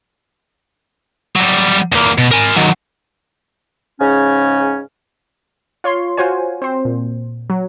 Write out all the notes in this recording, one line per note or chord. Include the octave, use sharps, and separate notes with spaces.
F#3 G3
E2 A#3
B2
A#4 G#5
D#3 F#3
G#2 C#3 C#4
F4 C#5 C6
F4 F#4 C5 C#5 G#5
C4 C5
A#2
F#3